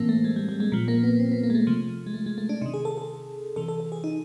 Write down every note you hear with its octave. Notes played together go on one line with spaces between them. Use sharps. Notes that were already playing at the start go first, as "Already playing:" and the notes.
Already playing: A2 E3 A#3 C4
A3
G#3
G3
G3
G#3
A#2 F3
A#3
B3
C4
B3
A#3
G#3
A3
C3 F3
G#3
A3
G#3
A3
D4
C3 D#3 D#4
G#4
A4
A4
C3 E3 A4
A4
A4
G#4
D#4